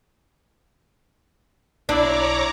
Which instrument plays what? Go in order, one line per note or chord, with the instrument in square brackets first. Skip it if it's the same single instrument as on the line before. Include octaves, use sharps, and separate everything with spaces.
[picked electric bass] B1 [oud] D4 [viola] E4 D5 [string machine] C#5 A#5 D6